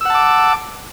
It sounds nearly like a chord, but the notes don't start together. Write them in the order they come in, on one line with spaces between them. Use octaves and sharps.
E6 F#5 A5 D6